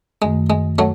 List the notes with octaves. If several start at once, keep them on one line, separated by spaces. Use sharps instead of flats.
F#2 D#3 G#3 A3
G#3
F#3 A3